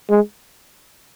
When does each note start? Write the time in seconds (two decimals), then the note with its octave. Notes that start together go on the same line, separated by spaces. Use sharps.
0.10 G#3